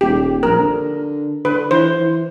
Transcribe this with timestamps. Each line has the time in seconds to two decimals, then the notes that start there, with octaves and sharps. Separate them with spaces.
0.01 D#1 G4
0.43 A#1 A#4
0.60 D3
1.45 D3 B4
1.71 E3 C5
2.00 E3